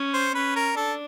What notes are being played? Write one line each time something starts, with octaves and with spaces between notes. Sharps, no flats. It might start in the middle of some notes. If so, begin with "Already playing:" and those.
Already playing: C#4
C5
C#4 B4
A#4
D4 A4